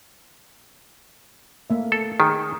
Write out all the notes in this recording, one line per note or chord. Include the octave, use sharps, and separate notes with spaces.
A3 A#3 E5
A4
D#3 G#4